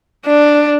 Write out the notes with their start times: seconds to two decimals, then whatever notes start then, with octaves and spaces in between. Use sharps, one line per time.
0.26 D4